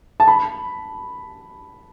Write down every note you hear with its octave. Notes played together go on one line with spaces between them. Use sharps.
A5
B5